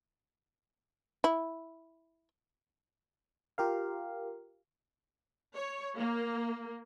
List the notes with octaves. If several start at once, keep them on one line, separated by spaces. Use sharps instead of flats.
E4
F4 G4 A#4 F5
C#5
A#3